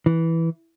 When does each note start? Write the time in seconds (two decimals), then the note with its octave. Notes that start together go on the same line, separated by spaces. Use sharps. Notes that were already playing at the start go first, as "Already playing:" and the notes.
0.06 E3